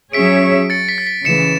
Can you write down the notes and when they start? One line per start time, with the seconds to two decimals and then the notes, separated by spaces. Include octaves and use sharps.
0.13 F#3 C#4 G#4 C#5 E5 B6 D7
0.70 A6 C#7
0.89 B6
0.98 A6
1.07 B6
1.25 C#3 E3 A3 C#7 E7